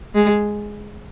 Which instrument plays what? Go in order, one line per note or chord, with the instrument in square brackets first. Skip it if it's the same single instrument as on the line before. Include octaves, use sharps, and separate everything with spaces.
[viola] G#3